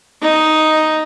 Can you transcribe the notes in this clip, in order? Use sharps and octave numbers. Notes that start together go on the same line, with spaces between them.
D#4